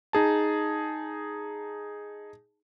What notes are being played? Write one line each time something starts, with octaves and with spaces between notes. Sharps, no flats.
D#4 G#4 A5